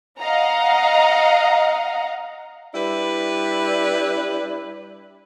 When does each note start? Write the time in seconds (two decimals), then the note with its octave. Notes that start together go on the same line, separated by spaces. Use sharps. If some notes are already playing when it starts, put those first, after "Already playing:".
0.19 D#5 F5 F#5 A#5
2.74 G3 D4 E4 B4